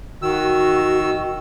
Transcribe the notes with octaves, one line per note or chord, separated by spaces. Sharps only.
D#3 F#4 E6